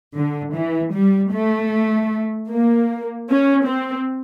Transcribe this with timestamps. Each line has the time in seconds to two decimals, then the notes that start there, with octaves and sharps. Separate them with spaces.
0.17 D3
0.56 E3
0.95 G3
1.33 A3
2.50 A#3
3.29 C#4
3.67 C4